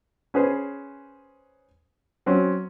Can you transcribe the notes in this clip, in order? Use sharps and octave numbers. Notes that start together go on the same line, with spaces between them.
C#4 G#4 B4 C5
F#3 C4 C#4